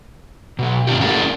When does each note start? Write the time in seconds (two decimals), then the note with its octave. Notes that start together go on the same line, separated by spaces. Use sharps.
0.59 B2 F#3
0.87 G2 D#3 C4 D4 F4 G4
1.01 C#4 D4 E4 F#4 G#4 A#4